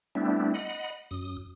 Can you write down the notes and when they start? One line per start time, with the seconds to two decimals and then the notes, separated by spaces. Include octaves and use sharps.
0.15 G3 A3 B3 C4 D4 E4
0.54 D#5 F#5 B5
1.11 F#2 D#6